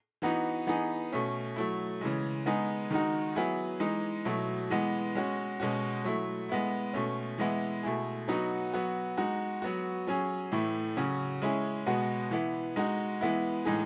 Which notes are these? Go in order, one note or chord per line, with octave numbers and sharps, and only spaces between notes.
E3 B3 D#4 F#4
E3 B3 D#4 G#4
B2 A3 C#4
F#3 A3 E4
C#3 E3 G#3
G#3 B3 D#4 G#4
D#3 G#3 D#4 F#4
F#3 B3 E4 G#4
E3 G#3 D#4
B2 F#3 A3 E4
E3 G#3 B3
G#3 C#4 F#4
B2 G#3 C#4 F#4
F#3 A3 E4
G#3 B3 E4
B2 A3 C#4
E3 G#3 B3 E4
B2 A3 E4 G#4
F#3 B3 D#4 F#4
F#3 B3 F#4
G#3 D#4 F#4
F#3 B3 F#4
F#3 C#4 G#4
A2 E3 A3 E4
C#3 F#3 C#4 F#4
G#3 C#4 E4 G#4
B2 G#3 B3 F#4
E3 B3 E4
G#3 D#4 F#4
E3 G#3 B3 E4
A2 E3 G#3 D#4 G#4